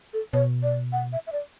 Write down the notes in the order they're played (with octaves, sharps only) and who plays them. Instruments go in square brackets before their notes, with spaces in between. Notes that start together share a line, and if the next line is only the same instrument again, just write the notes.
[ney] A4
[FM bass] B2 [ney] C#5
[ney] D5
F#5
E5
E5
D5